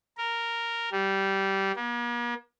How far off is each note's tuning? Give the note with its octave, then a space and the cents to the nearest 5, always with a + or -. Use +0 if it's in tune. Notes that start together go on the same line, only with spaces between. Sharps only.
A#4 -5
G3 -15
A#3 +45